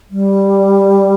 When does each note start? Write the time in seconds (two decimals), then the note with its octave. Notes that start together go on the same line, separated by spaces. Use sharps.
0.11 G3